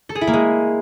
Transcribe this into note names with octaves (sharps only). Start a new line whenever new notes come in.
A4
G#4
E4
A#3
G#3